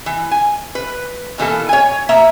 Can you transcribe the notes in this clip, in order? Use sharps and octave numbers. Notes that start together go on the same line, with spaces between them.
E3
G#5
B4
B2 E3 A#3 A4
C#5 G#5
A#3 B3 E5 A#5